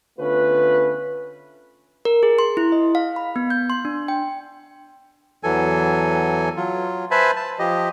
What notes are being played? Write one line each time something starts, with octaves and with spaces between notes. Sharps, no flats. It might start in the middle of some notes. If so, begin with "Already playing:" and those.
D3 A3 B3 C#4 F4 B4
A#4
G#4
C6
E4
D#5
F5
B5
B3
G6
C6
D4
G5
E2 E3 F#3 A4 G#5
F#3 F4
B4 C5 E5 G#5 A5 B5
A5
F3 G4 D#5